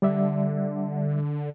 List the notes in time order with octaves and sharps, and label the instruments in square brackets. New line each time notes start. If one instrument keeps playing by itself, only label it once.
[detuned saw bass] D3 [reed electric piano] G3 D5 E5